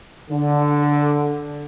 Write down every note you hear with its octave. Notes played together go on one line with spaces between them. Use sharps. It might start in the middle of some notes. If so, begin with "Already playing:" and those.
D3